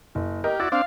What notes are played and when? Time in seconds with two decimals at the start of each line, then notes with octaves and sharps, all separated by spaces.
0.15 F#1
0.44 G4 A#4 D#5
0.60 E4 F#4 D5 A6
0.72 C4 D4 F5